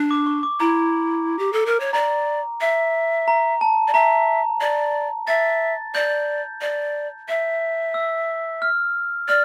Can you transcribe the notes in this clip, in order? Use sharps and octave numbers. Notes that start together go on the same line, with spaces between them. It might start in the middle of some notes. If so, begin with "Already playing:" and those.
Already playing: D4
D6
C#6
D6
E4 A#5
G4
A4
A#4
C#5
D5 A#5
E5
A#5
A5
D5
E5 A#5
D5
E5 A6
D5 G6
D5
E5
E6
F6
D5 F6